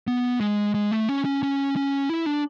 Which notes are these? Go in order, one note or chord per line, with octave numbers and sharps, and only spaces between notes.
B3
G#3
G#3
A3
C#4
C#4
C#4
C#4
E4
D4